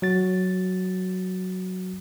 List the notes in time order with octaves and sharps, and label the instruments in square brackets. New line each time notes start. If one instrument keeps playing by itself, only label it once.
[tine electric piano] F#3 F#4 A6